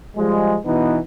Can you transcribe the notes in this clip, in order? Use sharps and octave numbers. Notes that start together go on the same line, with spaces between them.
F3 G3 G#3
B2 E3 B3 D#4